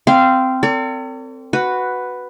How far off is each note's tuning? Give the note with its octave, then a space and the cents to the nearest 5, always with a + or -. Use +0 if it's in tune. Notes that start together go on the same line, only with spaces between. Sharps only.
C4 -10 F5 -20
A4 +40 D5 -45
F#4 +0 B4 +5